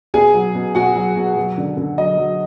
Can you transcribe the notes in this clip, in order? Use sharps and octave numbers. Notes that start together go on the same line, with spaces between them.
B2 G#4 G#5
F#3
B2
B2 F#4 F#5
F#3
B2
F#3
D3
D3
F#3 D#5
F#3